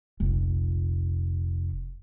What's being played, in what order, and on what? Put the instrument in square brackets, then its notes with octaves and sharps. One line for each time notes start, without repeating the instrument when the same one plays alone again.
[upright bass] F1 A#1